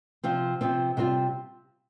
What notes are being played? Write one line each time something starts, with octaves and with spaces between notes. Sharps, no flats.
C3 F3 C4
C3 F3 C4
C3 G3 C4 F4